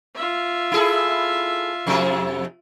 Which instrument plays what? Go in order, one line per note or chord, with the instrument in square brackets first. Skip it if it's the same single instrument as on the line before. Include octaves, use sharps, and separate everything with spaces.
[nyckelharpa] F4 E5
[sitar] E4 G#4 A4
F2 C3 A3